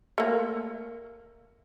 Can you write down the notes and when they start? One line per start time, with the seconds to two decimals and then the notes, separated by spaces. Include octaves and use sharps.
0.18 A3 A#3